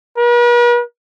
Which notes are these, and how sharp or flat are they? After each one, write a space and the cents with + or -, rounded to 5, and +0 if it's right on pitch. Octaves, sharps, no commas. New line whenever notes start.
B4 -45